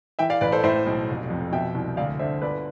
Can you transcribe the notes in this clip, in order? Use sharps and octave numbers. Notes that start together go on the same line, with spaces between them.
E3 E5 G5
D5 F5
A1 B4 D5
A4 C5
A2 C5 E5
B1
F1
F2
B2 E5 G5
C2
D2 D5 F5
D3 C5 E5
G1 B4 D5